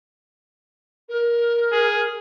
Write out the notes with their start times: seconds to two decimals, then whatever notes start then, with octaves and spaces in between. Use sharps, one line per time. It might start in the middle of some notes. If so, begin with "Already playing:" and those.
1.08 A#4
1.72 G#4